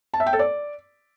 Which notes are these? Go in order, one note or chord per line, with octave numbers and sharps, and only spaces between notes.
A5
E5
G5
A4
D5